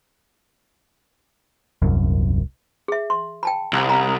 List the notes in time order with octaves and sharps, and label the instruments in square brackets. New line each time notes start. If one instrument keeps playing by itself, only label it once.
[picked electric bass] D#1 C2 F#2
[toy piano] G#4 E5
C6
G5 A5 B5
[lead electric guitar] C2
[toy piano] A#5 B5